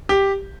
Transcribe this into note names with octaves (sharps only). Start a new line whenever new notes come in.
G4